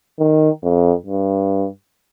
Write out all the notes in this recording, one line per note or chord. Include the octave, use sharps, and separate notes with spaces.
D#3
F2
G2